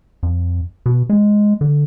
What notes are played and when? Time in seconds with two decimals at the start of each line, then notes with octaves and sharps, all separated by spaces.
0.23 F2
0.86 B2
1.09 G#3
1.61 D3